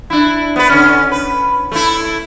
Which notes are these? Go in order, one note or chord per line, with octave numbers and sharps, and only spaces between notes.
D4 E4
B3 B4
D3 C#4
B4
A3 E4